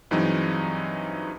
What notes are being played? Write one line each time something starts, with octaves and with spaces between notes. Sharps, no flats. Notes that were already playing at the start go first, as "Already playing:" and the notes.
G2 E3 F#3 G#3 C4 D#4